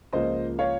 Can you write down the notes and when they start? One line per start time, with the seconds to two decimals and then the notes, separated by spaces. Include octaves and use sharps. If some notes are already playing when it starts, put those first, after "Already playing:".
0.13 C#2 C#3 F3 A#3 C5 D#5
0.59 C#5 F5